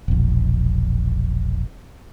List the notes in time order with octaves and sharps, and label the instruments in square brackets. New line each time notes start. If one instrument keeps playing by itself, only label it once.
[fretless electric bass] E1 A#1